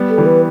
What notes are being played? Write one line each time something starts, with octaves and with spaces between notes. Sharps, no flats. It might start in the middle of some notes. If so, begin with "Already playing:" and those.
Already playing: G3 B3
A4
E3 G3
B4